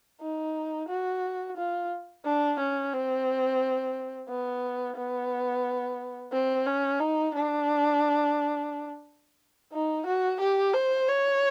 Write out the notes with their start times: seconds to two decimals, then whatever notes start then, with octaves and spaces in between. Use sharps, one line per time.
0.21 D#4
0.89 F#4
1.57 F4
2.25 D4
2.59 C#4
2.93 C4
4.29 B3
4.97 B3
6.33 C4
6.66 C#4
7.00 D#4
7.34 D4
9.73 D#4
10.06 F#4
10.40 G4
10.74 C5
11.08 C#5